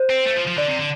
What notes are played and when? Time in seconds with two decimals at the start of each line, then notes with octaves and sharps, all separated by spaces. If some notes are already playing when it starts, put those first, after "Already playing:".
Already playing: C5
0.10 C4
0.26 A3
0.36 F3
0.47 F3
0.58 D3 D5
0.68 C3
0.79 D3